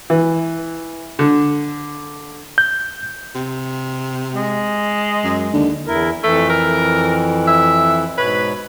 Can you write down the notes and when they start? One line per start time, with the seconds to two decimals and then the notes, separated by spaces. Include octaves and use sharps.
0.10 E3
1.19 D3
2.58 G6
3.35 C3
4.35 G#3
5.24 F#2
5.53 D#2 D3
5.86 E2 E4 A#4
6.24 F2 E3 A3
6.49 A#4
7.47 E5
8.17 G#2 B2 B4 C#5